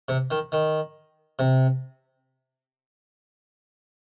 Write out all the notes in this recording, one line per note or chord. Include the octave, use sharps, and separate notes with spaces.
C3
D#3
D#3
C3